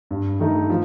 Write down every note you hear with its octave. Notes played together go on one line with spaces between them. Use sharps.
G2
D#3 A3 D#4
F3